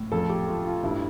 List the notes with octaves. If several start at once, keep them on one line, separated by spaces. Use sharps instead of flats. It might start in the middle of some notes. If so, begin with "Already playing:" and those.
Already playing: A2
F2 A4
G4
A3 F4
F4
G2 E4